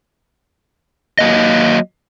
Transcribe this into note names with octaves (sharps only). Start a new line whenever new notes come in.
F#3 A#3 D#5